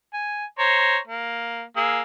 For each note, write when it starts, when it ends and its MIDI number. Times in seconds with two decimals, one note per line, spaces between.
0.14 0.45 80
0.59 0.98 72
0.59 0.98 73
0.59 0.98 82
1.07 1.63 58
1.77 2.02 58
1.77 2.02 68
1.77 2.02 88